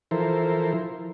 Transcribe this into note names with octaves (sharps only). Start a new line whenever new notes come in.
E3 F3 E4 A4 A#4 C5